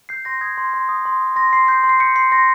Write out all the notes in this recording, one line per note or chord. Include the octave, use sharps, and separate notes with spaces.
G6 C7
C6 A#6
D#6 G#6
C6
C6
D#6
C6
D#6
C6 A#6
C6 C7
G6 C7
C6
C7
G6 C#7
C6 C7
C6 A#6